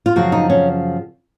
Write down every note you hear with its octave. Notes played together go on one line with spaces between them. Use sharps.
F4
F#2 C#3 F3 F#4
D#4
C#4